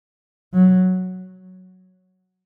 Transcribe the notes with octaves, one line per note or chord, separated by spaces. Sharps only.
F#3